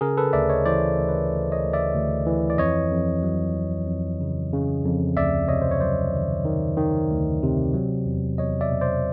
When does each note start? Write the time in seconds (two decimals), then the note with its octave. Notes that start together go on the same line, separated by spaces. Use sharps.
0.01 C#3 G#4 A#4
0.17 A4 B4
0.33 D2 D5 E5
0.49 C#5 D#5
0.66 E3 C5 D5
0.98 D2
1.08 B4 C#5
1.30 D2
1.52 C#5 D#5
1.63 D2
1.73 D5 E5
1.95 D2
2.26 E3
2.50 D5
2.58 F2 C#5 D#5
2.91 F2
3.23 F#3
3.56 F2
3.87 F2
4.21 C#3
4.53 C#3
4.85 F2
5.16 D2 D5 E5
5.48 C3 C#5 D#5
5.62 C5
5.71 C#5
5.80 F#3 C5 D5
6.14 D#3
6.45 D#3
6.77 D#3
7.10 D2
7.43 C3
7.74 F#3
8.06 E2
8.38 E2 C#5 D#5
8.61 D5 E5
8.71 B2
8.81 C5 D5